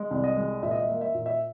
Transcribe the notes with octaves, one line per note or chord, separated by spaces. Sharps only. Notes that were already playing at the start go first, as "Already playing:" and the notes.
Already playing: G#3
C2
D#5
G#3
A#2 E5
D#5
E5
A#3
E5
A#2
E5